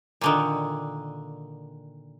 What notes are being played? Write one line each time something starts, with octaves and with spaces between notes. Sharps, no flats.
A#2 D3 D#3